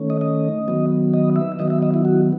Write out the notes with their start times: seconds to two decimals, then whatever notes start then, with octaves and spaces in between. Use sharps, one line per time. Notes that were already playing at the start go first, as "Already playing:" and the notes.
Already playing: D#3 A3 C#4
0.10 D#5
0.21 D#5
0.68 D#3 F#3 B3
1.14 D#5
1.36 E5
1.59 D#3 F#3 B3 D#5
1.70 E5
1.82 D#5
1.94 E4
2.05 F#4